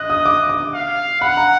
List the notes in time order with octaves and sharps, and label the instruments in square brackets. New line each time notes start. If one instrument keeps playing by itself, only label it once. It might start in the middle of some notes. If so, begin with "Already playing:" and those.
Already playing: [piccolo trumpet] D#5 [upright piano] F#6
[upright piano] D#6
D6
D6
[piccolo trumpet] F5
[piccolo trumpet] F#5 [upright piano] B5
[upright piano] A#5